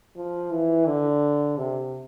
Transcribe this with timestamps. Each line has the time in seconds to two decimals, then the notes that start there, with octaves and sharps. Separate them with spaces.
0.16 F3
0.51 E3
0.86 D3
1.57 C3